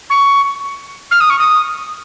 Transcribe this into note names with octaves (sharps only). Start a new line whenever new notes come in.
C#6
F6
D#6
C#6
D#6